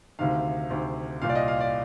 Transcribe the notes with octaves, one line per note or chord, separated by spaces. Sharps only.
D2 C3 D#3 F5
D2 C3 D#3
C2 A#2 F5
D5
D#5
F5
D5